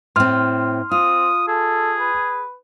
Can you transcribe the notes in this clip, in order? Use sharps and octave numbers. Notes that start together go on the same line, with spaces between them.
A2 C4 C6 F6
C4 F4 D#6
G#4 A4
B4